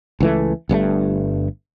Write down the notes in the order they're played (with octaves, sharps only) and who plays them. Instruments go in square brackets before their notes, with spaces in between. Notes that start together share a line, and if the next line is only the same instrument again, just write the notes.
[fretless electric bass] C#2 E3 A3
G1 G2 C#3 A3